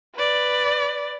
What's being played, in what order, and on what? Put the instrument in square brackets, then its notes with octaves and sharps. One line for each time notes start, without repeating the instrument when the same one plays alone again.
[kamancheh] B4 D5